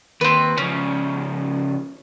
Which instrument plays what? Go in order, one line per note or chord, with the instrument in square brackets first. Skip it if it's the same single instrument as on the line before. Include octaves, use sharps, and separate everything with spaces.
[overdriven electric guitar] D#2 [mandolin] C4 B4
[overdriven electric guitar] C#3 F3 [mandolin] C#4